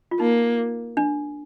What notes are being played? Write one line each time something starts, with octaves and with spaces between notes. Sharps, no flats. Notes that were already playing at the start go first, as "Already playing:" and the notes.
F4
A#3 D#4
D4